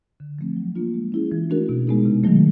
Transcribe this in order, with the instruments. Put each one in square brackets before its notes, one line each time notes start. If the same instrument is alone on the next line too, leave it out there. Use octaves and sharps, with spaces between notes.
[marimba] D3
F3 A3 C4
F#3
A#3 D4 F4
G#3
C#4 E4 G#4
E3
A3 D4 F#4 A#4
B2
G#3 B3 D#4 G#4
C3
D#3 F#3 A3